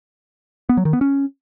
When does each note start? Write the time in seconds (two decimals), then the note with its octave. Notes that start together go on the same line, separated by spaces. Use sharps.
0.69 B3
0.77 F#3
0.85 D#3
0.93 B3
1.01 C#4